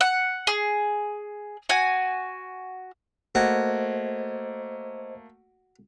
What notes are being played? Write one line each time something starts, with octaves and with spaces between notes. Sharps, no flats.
F#5
G#4
F#4 G#5
A3 A#3 F#4 C5 D#5 G#6